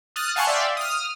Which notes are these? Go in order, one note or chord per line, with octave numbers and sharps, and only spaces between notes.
D#6 F6 F#6 A6
F5 F#5 G#5 A5 C6 C#6
D5 E5 F5 G5 C6
D#6 F6